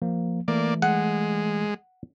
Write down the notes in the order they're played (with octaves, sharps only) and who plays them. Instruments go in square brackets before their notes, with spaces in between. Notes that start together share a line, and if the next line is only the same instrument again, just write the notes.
[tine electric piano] F3 A#3
[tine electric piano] E3 A3 [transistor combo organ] A#3 D5
[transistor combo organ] G#3 [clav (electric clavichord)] F#5